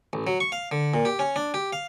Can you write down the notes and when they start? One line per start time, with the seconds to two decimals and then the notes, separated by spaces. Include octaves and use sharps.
0.13 A1
0.27 F#3
0.40 C#6
0.52 F5
0.71 D3
0.94 A#2
1.05 G4
1.19 C#4
1.36 D4
1.54 G4
1.73 F5